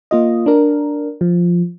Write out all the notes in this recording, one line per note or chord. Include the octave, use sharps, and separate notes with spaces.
A#3 F4 D#5
D4 A#4
F3